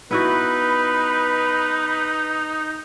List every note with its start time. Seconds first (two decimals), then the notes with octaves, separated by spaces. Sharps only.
0.11 B3 D#4 E4 F#4 B4 B5